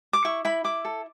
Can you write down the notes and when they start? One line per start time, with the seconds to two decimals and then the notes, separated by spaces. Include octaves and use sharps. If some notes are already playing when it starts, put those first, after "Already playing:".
0.13 D6
0.25 E4 C#6
0.45 E4 B5
0.64 E4 D6
0.85 A4